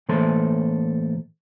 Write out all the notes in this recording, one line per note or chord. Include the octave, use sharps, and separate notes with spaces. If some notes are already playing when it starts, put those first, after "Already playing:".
A2 E3 A#3 A4 C5 C6